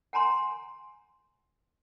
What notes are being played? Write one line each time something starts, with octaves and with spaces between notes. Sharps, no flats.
F#5 G#5 A#5 C6